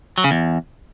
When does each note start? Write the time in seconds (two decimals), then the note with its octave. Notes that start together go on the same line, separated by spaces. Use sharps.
0.18 F#3
0.24 C#3
0.31 E2